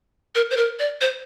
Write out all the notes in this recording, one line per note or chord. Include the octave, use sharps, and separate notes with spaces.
A#4
C5
A#4
D5
C5